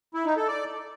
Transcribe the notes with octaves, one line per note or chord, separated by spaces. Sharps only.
E4
D#4
A4
D5